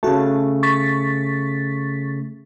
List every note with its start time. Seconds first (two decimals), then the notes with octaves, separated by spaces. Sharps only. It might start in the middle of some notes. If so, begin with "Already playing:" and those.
0.03 C#3 A3 F#4 A5
0.63 C#6 A6 B6